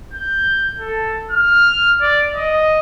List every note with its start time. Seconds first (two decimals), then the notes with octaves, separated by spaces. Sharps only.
0.13 G6
0.79 A4
1.31 F6
2.01 D5
2.35 D#5